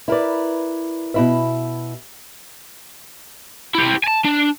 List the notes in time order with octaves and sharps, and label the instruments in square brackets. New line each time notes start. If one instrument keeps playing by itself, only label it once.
[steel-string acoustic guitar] E4 A#4 B4 D5
B2 E4 E5
[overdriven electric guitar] E4 G4
G#5 A5
D4